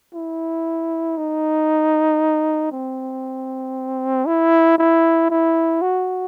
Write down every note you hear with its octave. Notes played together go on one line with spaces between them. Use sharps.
E4
D#4
C4
E4
E4
E4
F#4